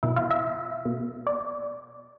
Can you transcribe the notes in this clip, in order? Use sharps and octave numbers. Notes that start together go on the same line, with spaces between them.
B2 E4
F4
E5
B2
D5